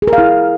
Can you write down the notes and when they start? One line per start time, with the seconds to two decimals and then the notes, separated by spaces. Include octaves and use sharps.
0.02 G#4
0.07 A#4
0.13 F5
0.18 E4